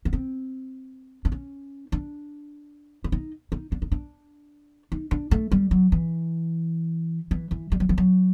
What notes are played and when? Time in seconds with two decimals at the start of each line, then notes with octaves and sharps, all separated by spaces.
0.05 B3
0.13 C4
1.25 D4
1.32 C#4
1.92 D4
3.04 E4
3.12 D#4
3.52 D#4
3.72 D4
3.82 D#4
3.92 D4
4.92 D#4
5.11 D4
5.31 A3
5.52 G3
5.71 F#3
5.92 E3
7.31 E3
7.51 E3
7.72 G3
7.80 F#3
7.89 F3
7.98 F#3